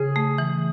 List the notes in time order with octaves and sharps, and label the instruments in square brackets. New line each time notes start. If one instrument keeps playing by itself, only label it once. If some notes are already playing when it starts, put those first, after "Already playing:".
Already playing: [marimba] C#3 [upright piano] G#4
[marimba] A3
E3